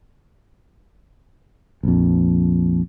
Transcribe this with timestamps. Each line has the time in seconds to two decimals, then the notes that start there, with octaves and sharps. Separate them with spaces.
1.83 A#1 F2